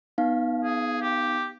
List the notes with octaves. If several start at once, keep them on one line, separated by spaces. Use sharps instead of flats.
B3 D#4 F5
G#4
G4